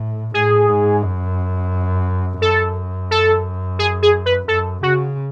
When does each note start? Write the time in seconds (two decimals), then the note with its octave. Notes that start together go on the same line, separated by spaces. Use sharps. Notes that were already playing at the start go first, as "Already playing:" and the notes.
Already playing: A2
0.34 A2 G#4
0.69 G#2
1.03 F#2
2.42 F#2 A4
3.11 A4
3.79 G#4
4.02 G#4
4.26 B4
4.48 F#2 A4
4.83 C#3 F#4